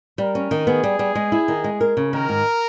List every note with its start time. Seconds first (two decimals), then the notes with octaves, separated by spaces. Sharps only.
0.18 G3 A#4
0.35 C#4
0.51 D#3
0.67 B3 G#4
0.83 G3
0.99 G3
1.15 G#3
1.32 E4
1.48 D#3
1.64 G#3
1.81 A#4
1.97 C#3
2.12 D#3 A#4
2.29 G#2